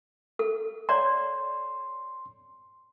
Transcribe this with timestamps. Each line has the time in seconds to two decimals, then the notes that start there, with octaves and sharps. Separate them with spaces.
0.39 A4
0.89 C#5 D5 A#5 C6